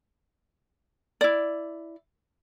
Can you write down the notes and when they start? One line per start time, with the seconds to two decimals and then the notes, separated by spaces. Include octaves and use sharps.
1.21 E4 D5